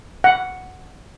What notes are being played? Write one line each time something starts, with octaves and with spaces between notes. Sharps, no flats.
F#5